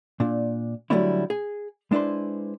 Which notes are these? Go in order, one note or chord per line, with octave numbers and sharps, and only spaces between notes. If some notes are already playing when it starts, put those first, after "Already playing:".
A#2 D4
D3 F#3 G3 A3 C#4 E4
G#4
G#3 D4 E4 B4 C5